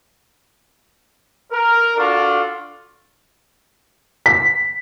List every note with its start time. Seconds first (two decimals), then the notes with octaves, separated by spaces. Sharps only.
1.52 A#4
1.97 D4 F4 F#4 A4 F5
4.26 B6